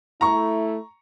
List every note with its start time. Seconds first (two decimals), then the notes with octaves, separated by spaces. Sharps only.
0.21 A3 E4 A#5 C#6